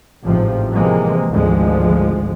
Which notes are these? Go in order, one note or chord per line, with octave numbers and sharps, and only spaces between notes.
A1 G#2 C3 F3
C3 E3 F3 G#3 A#3
G#1 D2 F3 G#3